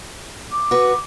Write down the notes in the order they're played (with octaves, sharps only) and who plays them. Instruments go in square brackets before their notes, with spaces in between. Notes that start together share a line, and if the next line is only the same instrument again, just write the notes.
[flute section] D6
[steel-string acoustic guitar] F#4 B4